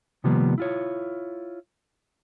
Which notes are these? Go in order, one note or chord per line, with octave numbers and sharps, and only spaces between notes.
C3 D#3 F3 G3 A#3 B3
E4 F4 C#5